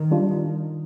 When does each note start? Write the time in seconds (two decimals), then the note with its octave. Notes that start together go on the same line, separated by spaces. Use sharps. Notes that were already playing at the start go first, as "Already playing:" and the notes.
Already playing: D#3
0.11 G3 D4 F4